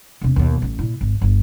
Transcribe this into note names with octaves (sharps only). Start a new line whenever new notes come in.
E1 C3
D#2 B2
A1 A2
A#2 E4
G#1
G1 F4